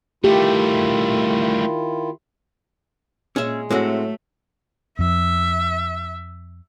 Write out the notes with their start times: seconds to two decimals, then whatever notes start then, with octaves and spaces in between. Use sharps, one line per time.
0.24 D#3 G3 A3 E4 F4 G4
3.36 A#2 G#3 C#4 E5
3.71 A2 F#3 G#3 A3 C4 F#4
4.99 F2 F3 E5